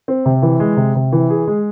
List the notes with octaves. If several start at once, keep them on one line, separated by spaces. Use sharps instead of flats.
C4
C3
E3
G#3
C3
C3
E3
G#4
G#3